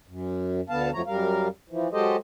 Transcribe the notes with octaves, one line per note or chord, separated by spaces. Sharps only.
F#2
D2 D3 B3 F5 A5
F2 F3 F#3 A3 C#5 A#5
F#2 G3 A#4 F5
E3 F3
F#3 G#3 G4 A4 C5 D#5